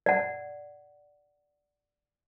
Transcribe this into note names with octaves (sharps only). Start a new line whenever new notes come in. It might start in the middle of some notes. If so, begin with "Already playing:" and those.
D5 F#5